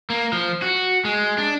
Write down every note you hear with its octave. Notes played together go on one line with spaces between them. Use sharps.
A#3
F3
F#4
G#3
D4